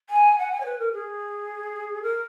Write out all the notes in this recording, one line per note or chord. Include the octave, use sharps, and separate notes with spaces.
G#5
F#5
G#5
C#5
B4
A#4
G#4
A#4